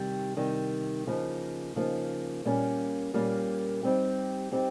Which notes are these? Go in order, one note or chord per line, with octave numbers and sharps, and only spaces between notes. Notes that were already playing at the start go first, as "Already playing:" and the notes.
Already playing: C3 D#3 G3
C3 D#3 G3
C#3 F3 A#3 D#4
C#3 F3 A#3 D#4
A#2 G3 A#3 C#4
A#2 G3 A#3 C#4
G3 C4 D#4 G4
G3 C4 D#4 G4